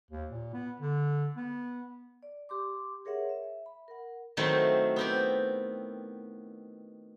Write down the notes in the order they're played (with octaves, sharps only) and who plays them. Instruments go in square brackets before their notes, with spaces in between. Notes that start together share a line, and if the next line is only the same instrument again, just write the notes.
[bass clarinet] D#2
A#2
B3
D3
B3
[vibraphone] D5
G4 C6 D6
G#4 A#4 C#5 E5 F#5
E5
B5
A#4 F#5
[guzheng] D#3 F#3 A3 C4 E4
B3 C4 G4